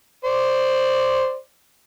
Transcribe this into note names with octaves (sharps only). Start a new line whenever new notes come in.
C5 D5